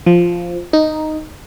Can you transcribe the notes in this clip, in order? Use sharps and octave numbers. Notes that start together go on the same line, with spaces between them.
F3
D#4